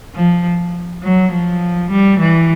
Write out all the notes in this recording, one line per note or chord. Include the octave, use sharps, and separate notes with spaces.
F3
F#3
F3
G3
E3